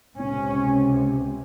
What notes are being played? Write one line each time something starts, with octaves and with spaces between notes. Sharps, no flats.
C#2 C3 C#4